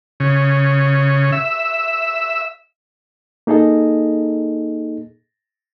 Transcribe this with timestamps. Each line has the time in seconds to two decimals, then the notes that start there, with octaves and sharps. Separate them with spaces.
0.20 C#3
1.32 E5
3.47 A#3 D#4 G#4 A4 D#5